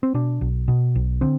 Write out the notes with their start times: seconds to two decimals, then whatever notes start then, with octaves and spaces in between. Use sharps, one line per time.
0.03 C4
0.14 B2 D4
0.41 B1
0.68 B2
0.95 B1
1.21 D3 C4